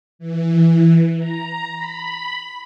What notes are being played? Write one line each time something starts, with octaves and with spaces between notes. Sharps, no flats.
E3
A#5
B5